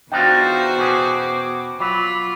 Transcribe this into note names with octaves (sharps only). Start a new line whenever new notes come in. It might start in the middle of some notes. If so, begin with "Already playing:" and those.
E2 D4 D#4 F4 F#4 C5 G5
B2 C#4 G#4 D6
F#3 F4 B5 D6 B6